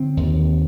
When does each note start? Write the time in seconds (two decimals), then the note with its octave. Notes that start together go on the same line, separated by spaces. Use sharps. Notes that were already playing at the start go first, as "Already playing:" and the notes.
Already playing: D3 C4
0.17 D#2